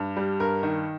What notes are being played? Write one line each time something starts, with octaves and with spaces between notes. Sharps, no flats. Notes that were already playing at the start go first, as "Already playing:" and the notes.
Already playing: G2
G3
G2 A#4
D#3